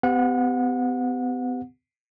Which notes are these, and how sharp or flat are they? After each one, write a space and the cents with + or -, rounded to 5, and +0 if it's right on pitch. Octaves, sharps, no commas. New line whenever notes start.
B3 +40 G4 +0 F#5 -30